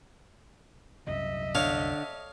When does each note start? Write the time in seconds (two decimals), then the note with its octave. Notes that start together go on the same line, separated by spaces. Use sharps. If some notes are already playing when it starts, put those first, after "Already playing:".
1.07 C2 F#2 F#3 D#5 E5
1.55 D3 C#5 F5 D#6